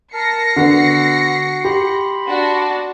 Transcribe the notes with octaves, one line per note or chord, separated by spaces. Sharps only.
A#4 A5 F6 A#6 C7 C#7
D3 B3 F#4
G4 B5 C6
D4 F#4